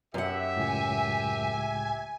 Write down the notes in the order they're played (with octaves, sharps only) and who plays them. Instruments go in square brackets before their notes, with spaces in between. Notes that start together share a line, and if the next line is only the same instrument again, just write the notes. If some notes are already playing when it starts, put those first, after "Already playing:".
[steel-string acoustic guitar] F#2 F#5 [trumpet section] G4 E5
[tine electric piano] C#2 A2 [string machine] G#5